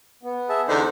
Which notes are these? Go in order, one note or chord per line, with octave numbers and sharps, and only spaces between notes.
B3
G#4 E5 A5
E2 D3 D#4 C5